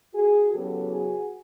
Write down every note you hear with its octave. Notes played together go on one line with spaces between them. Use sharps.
F#4 G#4
E2 C#3 F#3 B3 G4 A4
F#4 G#4